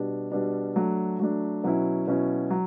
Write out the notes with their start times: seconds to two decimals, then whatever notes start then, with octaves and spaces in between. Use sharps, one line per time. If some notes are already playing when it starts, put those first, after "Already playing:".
Already playing: B2 G3 D4
0.32 B2 G3 D4
0.76 F#3 A3 D4
1.19 F#3 A3 D4
1.64 B2 F#3 C#4 E4
2.08 B2 F#3 C#4 E4
2.50 F#3